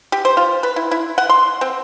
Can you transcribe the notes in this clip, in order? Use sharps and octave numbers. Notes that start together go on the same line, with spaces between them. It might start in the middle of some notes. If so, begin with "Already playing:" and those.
G4
C5
F4
B4
E4
E4
F#5
C6
C4